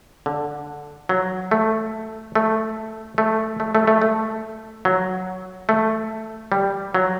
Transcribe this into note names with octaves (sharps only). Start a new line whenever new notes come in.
D3
F#3
A3
A3
A3
A3
A3
A3
A3
F#3
A3
G3
F#3